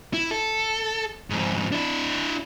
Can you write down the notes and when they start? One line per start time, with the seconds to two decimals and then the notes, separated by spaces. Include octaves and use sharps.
0.14 E4
0.31 A4
1.30 F2 G#2
1.72 D4 E4